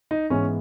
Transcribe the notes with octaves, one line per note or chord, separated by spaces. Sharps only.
D#4
G#2 E3 G#3 B3 C#4